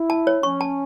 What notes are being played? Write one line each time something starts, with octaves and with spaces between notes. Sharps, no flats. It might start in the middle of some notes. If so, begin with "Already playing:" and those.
Already playing: E4
A5
C#5
C#4 C#6
A5